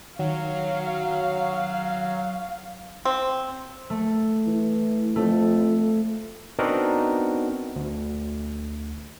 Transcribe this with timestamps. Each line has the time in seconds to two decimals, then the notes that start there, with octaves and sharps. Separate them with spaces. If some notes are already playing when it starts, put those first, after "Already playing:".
0.19 D#3 F#3 F5
3.05 C4
3.90 A3
4.47 E3
5.16 F2 A3
6.59 B3 C4 D4 D#4 F#4 A#4
7.76 D2